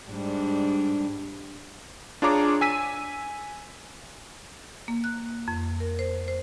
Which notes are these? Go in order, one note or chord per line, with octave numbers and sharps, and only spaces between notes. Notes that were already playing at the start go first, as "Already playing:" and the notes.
G#2 G3 D4
D4 F4 G#4 C#5 A#5 D6
G#5 E6 B6 D#7
A#3
F#6
F2
A#4
C5
C5